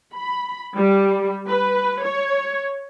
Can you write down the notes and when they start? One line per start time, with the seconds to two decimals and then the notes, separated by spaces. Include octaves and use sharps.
0.14 B5
0.76 G3
1.48 B4
2.04 C#5